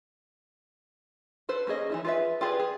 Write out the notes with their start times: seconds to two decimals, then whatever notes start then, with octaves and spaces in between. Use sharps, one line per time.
1.49 A4 B4 C5
1.67 A#3 C#4 G#4 D#5
1.90 E3 D#4 E4
2.05 F4 G#4 B4 D#5 E5
2.41 F4 G4 G#4 B4 D5
2.60 G#4